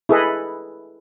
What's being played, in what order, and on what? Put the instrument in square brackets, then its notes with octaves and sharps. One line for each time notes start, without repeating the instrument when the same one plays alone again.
[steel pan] E4 G#4 A4 B4 D#5